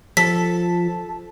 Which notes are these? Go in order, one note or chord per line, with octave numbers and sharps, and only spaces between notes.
F3 A4 B6